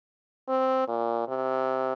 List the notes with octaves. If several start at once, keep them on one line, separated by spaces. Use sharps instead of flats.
C4
A#2
C3